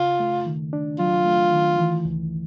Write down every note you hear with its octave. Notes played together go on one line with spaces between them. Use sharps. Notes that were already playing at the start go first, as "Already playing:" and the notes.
Already playing: C#3 F4
A3
D#3
D4
F#3 F4
A3
D#3
E3
C#2